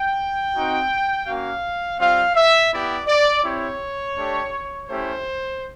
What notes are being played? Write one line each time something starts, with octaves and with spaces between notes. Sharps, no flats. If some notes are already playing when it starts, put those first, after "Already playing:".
Already playing: G5
C4 D#4 F#4
A#3 C#4 F#4 F5
G3 C4 F4 F5
E5
B3 E4 G4 D5
D5
C4 E4 G4 C#5
A3 D4 G4
A3 C#4 E4 G4 C5